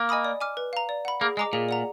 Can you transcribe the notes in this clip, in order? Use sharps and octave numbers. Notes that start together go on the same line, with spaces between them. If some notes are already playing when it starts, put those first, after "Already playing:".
Already playing: A#3
D#5 G#5 B5 D#6
D5
G#5 D6 F6
B4
F5 A#5
D5
F#5 B5
A#3 G#4
G#3 D#5 A#5 D6
A#2 G#4
D5 F#5 A#5